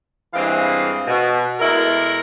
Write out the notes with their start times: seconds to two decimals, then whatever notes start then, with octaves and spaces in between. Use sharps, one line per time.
0.34 G2 E3 G#3 C4 G#4 F5
1.08 B2
1.60 B2 G#3 A3 E4 A#4